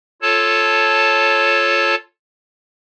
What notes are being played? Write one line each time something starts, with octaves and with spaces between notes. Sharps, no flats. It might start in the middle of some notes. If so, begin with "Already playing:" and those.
F4 A4 C#5 A5